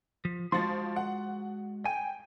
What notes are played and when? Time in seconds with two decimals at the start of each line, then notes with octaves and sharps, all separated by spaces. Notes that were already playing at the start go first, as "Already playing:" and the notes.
0.25 F3
0.52 F3 G#3 F#4 C6 A6
0.96 F#5
1.86 G5 G#5